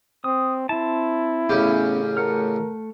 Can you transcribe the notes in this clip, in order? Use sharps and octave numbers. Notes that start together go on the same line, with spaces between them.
C4 D#6
C4 E4 A5
A1 C#3 B3 C#4 G4
A3 A#4 F#5 F6